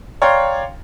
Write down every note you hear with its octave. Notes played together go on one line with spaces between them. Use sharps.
C#5 D5 F5 G5 A#5 C6